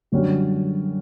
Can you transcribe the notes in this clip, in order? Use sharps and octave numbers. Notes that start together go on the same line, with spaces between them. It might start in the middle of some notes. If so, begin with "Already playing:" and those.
F#2 D3 G3 C#4 F#4